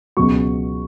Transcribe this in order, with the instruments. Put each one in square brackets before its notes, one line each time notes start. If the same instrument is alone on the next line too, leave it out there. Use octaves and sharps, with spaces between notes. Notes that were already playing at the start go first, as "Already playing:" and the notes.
[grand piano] C#2 B2 F#3 C#6